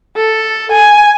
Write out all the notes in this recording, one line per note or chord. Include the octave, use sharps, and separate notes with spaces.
A4
G#5